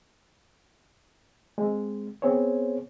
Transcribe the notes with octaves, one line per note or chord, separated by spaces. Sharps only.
G#3 C4
B3 C4 G#4 C5 C#5